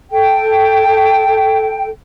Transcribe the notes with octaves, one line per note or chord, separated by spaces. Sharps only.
A4 G5